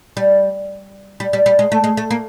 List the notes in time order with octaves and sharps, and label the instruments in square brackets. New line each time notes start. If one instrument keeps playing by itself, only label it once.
[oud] G3
G3
G3
G3
G#3
A3
G#3
A3
A#3